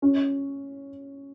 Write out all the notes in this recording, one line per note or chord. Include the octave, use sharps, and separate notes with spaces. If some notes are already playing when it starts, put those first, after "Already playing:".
C#4